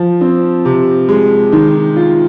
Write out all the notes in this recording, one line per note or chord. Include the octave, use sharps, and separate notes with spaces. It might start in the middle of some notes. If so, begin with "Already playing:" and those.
Already playing: F3
C4
C3
G#3
D#3
F4